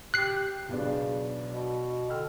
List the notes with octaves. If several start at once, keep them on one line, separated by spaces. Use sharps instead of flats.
G4 F#6 C7
B1 C#3 B3 D4
B2
D3 G5 E6 F6